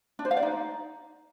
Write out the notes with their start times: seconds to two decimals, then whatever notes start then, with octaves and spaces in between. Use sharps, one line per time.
0.19 D4
0.25 C5
0.31 F5
0.37 D5
0.43 D#4